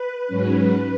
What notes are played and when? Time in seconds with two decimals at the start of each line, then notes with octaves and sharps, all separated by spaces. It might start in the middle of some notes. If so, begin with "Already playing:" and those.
Already playing: B4
0.27 G#2 F#3 C#4